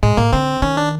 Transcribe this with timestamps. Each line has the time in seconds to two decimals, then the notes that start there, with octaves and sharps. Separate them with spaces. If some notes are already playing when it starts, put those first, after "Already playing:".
0.03 A2 G#3
0.17 A2 A#3
0.33 D3 C4
0.62 D#3 C#4
0.77 D4